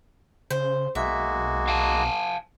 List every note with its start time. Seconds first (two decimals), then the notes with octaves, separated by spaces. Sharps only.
0.50 C#3 C5
0.95 B1 G#3 A#3 F#4 E5
1.68 F5 G#5 A5